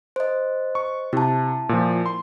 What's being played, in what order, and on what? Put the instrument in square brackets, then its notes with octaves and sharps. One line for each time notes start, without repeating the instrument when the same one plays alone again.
[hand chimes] C5 D#5
[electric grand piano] C#6
[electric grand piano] C3 [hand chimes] E4 A5
[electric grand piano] A#2 F3
C6